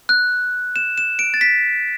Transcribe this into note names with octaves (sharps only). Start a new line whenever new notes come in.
F#6
E7
E7
D7
A6
B6